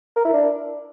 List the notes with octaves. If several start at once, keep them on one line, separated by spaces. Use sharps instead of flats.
A#4
E4
D4